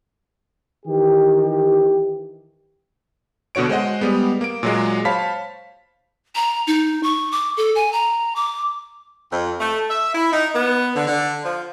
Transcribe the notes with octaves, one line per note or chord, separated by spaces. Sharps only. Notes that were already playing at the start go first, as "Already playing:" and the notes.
D#3 E3 G4
B2 D3 F#4 C#5 D7
G#3 C5 D#5 F#5
G3 G#3 B3
A#3 D7
A#2 F#3 G#3
C5 C#5 F5 A5 B5 B6
A#5
D#4
C#6
D6
A4
G#5
A#5
D6
F2
A3
E5
E4
D#4
B3
D3
D3
F3